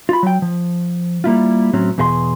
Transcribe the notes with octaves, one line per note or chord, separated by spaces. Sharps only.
F4 B5
F#3 G5
F3
G3 A#3 E4 F4
A2 F#3 C4 C#4
E2 B2 G#4 E5 C6